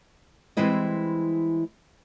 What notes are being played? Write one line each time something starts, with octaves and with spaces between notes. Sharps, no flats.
E3 G3 G#3 C4 E4 D#5